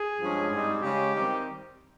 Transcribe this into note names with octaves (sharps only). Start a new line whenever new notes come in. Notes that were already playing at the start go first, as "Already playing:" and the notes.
Already playing: G#4
G2 F3 G#3 C#4
G#2 G3 C4 D#4
C#3 G#3 C#4 G4
D#3 G3 C4 D#4